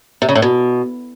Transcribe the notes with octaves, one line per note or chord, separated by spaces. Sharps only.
C3
C#3
A2
B2